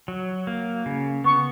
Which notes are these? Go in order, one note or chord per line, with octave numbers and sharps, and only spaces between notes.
F#3
A#3
C#3
B3 C#6